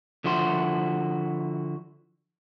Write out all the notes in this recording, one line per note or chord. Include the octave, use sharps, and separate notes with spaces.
D3 F3 E4 F#4 C6